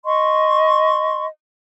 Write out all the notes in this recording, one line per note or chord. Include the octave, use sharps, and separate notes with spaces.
D#5 C6 C#6